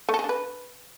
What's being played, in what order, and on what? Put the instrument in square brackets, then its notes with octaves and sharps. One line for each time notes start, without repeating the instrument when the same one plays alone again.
[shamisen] A3
A4
G#4
D4
B4